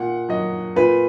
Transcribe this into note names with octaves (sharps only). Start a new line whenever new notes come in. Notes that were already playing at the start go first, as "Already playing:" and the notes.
Already playing: A#2 F#5
F#3 D#5
A#2 B4